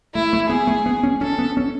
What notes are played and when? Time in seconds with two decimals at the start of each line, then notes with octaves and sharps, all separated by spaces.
0.15 A3 E4
0.33 A3
0.50 B3 G#4
0.67 A3
0.86 B3
1.03 C#4
1.21 C#4 A4
1.38 B3
1.57 C#4